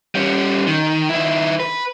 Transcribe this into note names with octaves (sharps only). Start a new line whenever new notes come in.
G3 C#4
D#3
D#3 E4
B4